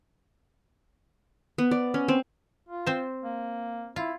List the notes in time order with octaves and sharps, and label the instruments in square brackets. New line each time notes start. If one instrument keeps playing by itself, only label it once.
[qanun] B3
D5
C#4
C4
[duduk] F4
[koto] C4 C5
[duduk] A#3
[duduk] E4 [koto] F4